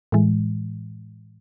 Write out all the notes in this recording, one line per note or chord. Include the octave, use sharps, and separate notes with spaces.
A2 E3 G#3